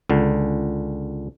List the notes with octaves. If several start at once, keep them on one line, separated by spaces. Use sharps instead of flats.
C#2 D3